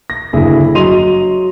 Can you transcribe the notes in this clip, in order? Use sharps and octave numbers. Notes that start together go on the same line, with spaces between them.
A#6
F#1 G2 D3 E4 G#4
F#3 D#5 C6 D#7 F7